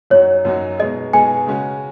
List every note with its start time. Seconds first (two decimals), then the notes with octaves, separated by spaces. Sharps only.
0.10 F#2 F#3 D#4 F#4 C#5
0.45 F#2 F#3 D#4 F#4
0.79 B2 G#3 D#4 G#4 D#5
1.13 B2 G#3 D#4 G#4 G#5
1.47 C#3 G#3 C#4 F#4